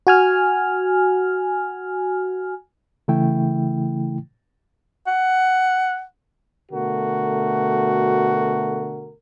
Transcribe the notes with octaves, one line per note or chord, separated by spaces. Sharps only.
F#4 G#5 F6
C#3 E3 A3 E4 G5
F#5
B2 D3 A3 F#4 A#4